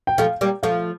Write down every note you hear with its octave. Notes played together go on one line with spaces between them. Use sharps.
G5
F3 A3 F5
G3 A#3
F3 A3 F5